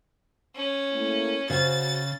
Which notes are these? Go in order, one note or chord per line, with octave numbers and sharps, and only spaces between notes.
C#4
A3 A#3 E4
C#3 F#4 C5 A6